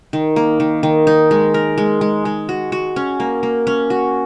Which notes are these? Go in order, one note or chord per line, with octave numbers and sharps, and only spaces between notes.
D#3
A#3
D#3
D#3
D#4
G#3
A#4
G#3
G#3
G#3
F#4
F#4
C#4
A#3
A#3
C#4
F#4